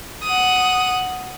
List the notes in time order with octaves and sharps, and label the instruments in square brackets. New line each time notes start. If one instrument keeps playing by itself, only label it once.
[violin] F#5 D#6